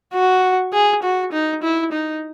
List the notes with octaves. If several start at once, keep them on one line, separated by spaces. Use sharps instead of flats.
F#4
G#4
F#4
D#4
E4
D#4